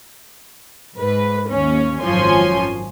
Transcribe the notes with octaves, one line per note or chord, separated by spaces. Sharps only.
G#2 B4
D#2 C#4
G#1 F#2 F3 C#5 G#5 C6